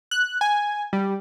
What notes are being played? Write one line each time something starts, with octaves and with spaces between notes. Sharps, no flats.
F#6
G#5
G3